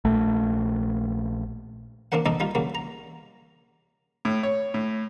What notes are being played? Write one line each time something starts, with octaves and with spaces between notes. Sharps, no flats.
A#1 A3
A#3 C4 D4 A#4 F#5
C4 D4 D#4 A4 D#5
G3 D#4 F4
C#3 F#3 A#3
A#5
A2
C#5
A2